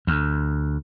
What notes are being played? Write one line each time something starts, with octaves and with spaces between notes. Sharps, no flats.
D2